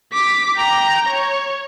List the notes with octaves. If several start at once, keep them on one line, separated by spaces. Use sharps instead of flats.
D6 B6
G5 A#5
C#5